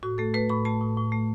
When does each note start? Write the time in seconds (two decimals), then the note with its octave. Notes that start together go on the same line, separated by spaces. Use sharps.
0.03 A2 F#4
0.18 A3 A4
0.34 A3 B4
0.49 A2 B5
0.65 A3 A5
0.81 A2
0.97 A2
1.12 A3